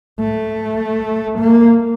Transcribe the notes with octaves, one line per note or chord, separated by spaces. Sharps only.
A3
A#3